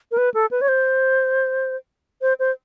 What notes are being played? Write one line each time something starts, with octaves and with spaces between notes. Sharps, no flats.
A#4
B4
A4
B4
C#5
C5
C5
C5